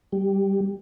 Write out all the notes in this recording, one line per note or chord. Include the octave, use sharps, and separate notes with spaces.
G3